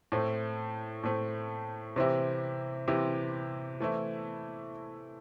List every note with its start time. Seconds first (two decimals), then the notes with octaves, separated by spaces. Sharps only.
0.12 A2 A3 C4
1.04 A2 A3 C4
1.96 C3 E3 C4 E4 G4
2.88 C3 E3 C4 E4 G4
3.80 E3 A3 C4 E4